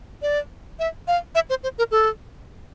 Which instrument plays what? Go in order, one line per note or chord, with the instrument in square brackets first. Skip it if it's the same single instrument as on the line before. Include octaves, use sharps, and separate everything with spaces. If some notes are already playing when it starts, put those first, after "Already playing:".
[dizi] D5
E5
F5
E5
C5
C5
A#4
A4